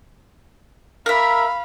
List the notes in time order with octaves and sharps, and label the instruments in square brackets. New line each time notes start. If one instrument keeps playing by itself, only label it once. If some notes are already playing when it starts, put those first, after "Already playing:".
[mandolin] A#4 E5 [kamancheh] F5 B5